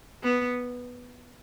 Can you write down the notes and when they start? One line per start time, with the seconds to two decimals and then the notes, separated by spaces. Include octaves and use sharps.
0.23 B3